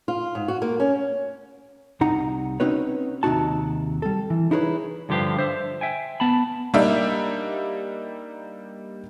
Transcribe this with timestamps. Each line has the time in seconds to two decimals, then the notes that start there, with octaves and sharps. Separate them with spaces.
0.08 F4
0.35 G#2
0.48 F#4
0.62 A#3
0.80 C#4
2.01 C2 C3 D#4 F#5 A#5
2.60 C4 C#4 D#4 F#4 B4 C#5
3.23 D#2 C3 D4 D#4 F#4 A5
4.02 G3 A4
4.30 E3
4.51 D#4 E4 G#4 A#4 B4 C#5
5.09 G2 D3 F3 G4 B4 F5
5.39 C5 E5
5.81 E5 G5 G#5
6.20 B3 A5 B5
6.74 G3 A#3 D4 D#4 G4 E5